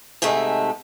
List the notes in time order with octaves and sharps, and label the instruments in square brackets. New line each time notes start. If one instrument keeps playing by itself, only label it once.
[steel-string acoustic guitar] G#2 C3 G#3 A3